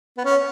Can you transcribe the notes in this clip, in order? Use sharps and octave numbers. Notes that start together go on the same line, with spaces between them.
B3
C#4